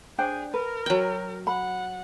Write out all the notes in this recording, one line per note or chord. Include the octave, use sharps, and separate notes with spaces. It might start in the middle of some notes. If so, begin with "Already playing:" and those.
D4 G#4 C5 G5
A#4 B4
F#3 G5
F#5 B5